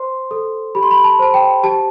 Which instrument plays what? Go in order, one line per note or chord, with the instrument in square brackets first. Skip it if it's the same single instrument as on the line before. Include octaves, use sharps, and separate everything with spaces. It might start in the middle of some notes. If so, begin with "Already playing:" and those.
Already playing: [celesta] C5 C6
A4
G4 B5
C6
B5
A5
C5 A5
G5
G4 A5